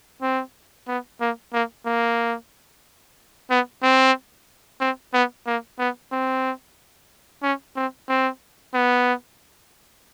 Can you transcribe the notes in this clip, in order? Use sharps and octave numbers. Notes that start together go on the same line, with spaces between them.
C4
B3
A#3
A#3
A#3
B3
C4
C4
B3
A#3
B3
C4
C#4
C4
C4
B3